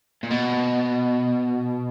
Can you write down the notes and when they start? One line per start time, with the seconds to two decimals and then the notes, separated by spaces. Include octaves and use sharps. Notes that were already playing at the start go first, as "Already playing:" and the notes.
0.23 A#2
0.31 B2